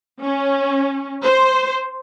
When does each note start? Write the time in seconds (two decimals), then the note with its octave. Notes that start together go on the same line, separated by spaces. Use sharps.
0.21 C#4
1.24 C5